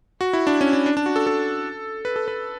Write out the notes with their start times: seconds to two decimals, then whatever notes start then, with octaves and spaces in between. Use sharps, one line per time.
0.21 F#4
0.33 E4
0.47 D4
0.61 C#4
0.73 D4
0.86 D4
0.97 D4
1.06 F#4
1.16 A4
1.27 A4
2.05 B4
2.16 A4
2.28 B4